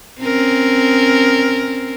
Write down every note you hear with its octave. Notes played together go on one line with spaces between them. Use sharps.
C4 C#4 A#4